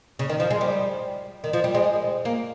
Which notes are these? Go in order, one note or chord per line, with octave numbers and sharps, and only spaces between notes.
C#3
D#3
F3
G#3
G3
D#3
F3
G3
G#3
A#3